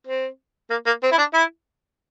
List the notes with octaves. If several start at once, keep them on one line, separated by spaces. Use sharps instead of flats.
C4
A#3
A#3
C4
E4
D4
E4